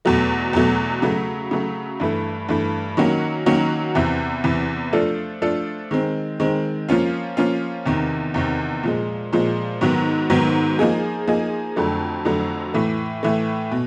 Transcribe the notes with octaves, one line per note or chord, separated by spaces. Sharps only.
E2 B2 F#3 A3
E2 B2 F#3 A3
C#3 F#3 A3
C#3 F#3 A3
G2 E3 A3
G2 E3 A3
D#3 F#3 A#3 C#4 F#4
D#3 F#3 A#3 C#4 F#4
E2 C3 E3
E2 C3 E3
F3 A3 D4 F4 A4
F3 A3 D4 F4 A4
D#3 G#3 C4
D#3 G#3 C4
F3 A#3 C#4 F4
F3 A#3 C#4 F4
E2 C3 D#3
E2 C3 D#3
A#2 F3 G#3
A#2 F3 G#3
G#2 D#3 F#3 B3
G#2 D#3 F#3 B3
F3 A#3 D#4 G#4
F3 A#3 D#4 G#4
F2 D3 F#3 A3
F2 D3 F#3 A3
A2 E3 A3
A2 E3 A3
B2